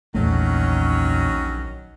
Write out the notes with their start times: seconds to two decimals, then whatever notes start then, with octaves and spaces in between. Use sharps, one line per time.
0.15 A#1 E2 A#2 D#3 F#3 A3 C#4